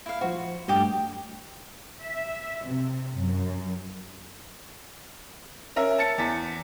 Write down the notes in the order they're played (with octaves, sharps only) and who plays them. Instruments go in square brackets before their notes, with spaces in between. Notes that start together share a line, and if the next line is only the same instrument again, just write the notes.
[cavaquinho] E4 F5
[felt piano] F3 C5 [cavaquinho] F#4
[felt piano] G2 A3 [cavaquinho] G4 D#5
[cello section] E5
C3
F#2
[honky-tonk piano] C#4 A#4 E5
A5 A6 C#7
E2 A6 B6